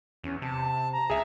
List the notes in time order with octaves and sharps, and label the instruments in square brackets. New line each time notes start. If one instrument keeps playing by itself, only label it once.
[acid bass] E2 [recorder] C#4
[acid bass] C3 [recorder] A5
[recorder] A#5
[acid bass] C#2 [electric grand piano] G#4 E5